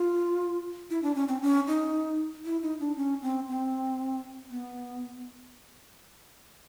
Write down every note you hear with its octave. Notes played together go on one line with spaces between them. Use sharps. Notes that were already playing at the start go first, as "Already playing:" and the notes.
Already playing: F4
E4
D4
C#4
C4
C#4
D#4
E4
D#4
D4
C#4
C4
C4
B3